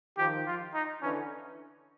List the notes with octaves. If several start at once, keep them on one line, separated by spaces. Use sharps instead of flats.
D#3 F3 G4
F4
D#4
D3 E3 C#4